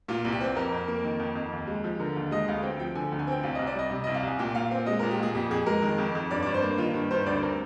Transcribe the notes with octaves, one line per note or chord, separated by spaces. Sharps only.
A#2 F4
C2
G4
C4
F2 A#4
F2
A#3
D#3
F2
F2
D#2
G#3
F3
D3 A#4
D#2
G#3 D#5
D2 F5
C4 G5
F3 G5
D3 G#5
D2
G#5
C4 G5
C2 F5
D#5
C2
D5
G3 D#5
C3
C2 D#5
F5
C2 G#5
A#2 G5
A#2 F5
C4
G#3 D#5
A#2 A#4
G4
A#2 G#4
F2 G4
F2 G#4
G#3 A#4
D#3
F2
F2
G2 D5
D5
G2
C5
A#3
D#3 F4
G2
G2 C5
D2 D5
C4 A#4